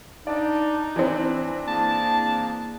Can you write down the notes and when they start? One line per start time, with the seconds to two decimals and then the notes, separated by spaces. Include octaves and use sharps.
0.27 D4 D#4 D5 A6
0.96 E3 C4 D4
1.68 A#3 G#4 A5